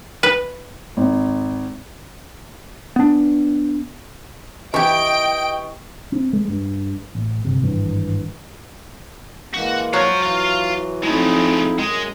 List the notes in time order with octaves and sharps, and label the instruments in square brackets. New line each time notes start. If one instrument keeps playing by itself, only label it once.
[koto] B4
[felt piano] G#1
[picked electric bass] B3 D4
[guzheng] E3 G4 [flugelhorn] D#5 [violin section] G5 D7 [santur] C#6
[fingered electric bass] C4
G#3
G2
A1
G1 C3
G#1 G2 E3
[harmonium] E3 G#3 A#3 [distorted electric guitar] F#4
[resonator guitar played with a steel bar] F#3 [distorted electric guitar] C5 F5
[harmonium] E3 [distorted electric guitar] F4 F5
[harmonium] F2 D#4 E4 [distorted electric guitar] G#3 A3
[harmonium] F#2 [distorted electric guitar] G#3